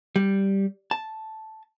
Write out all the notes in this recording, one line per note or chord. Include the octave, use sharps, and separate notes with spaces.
G3
A5